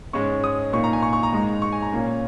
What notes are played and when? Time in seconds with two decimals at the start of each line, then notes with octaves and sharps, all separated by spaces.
0.13 G#2 G#3 C#4 C#6
0.44 D#6
0.73 A#2 A#3 D#4 C#6
0.84 A#5
0.93 G#5
1.02 C#6
1.13 C#6
1.23 A#5
1.33 G#2 G#3 D#4
1.62 C#6
1.72 G#5
1.82 A#5
1.92 A#2 A#3 C#4